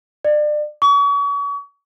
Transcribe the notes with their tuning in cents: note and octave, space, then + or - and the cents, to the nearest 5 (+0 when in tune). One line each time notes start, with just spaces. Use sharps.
D5 +30
C#6 +40